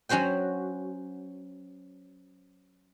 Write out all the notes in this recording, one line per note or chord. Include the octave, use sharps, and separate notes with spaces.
F#3 C#4 F#4 C5 G5